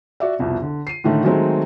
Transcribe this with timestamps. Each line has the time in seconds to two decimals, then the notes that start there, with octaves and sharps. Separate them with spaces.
0.20 F#4 D5 E5
0.39 C2 F2 B2
0.62 D3
0.87 C7 D#7
1.04 A2 D3 D#3 A3
1.24 D#3 F#3 G#3 A3 C4